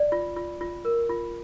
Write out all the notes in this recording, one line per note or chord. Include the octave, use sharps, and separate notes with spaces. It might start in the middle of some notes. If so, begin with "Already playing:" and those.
Already playing: D5
F4
F4
F4
A#4
F4